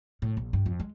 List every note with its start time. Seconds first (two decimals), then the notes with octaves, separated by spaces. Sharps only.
0.22 A2
0.37 A#1
0.53 G2
0.66 F2
0.80 G#3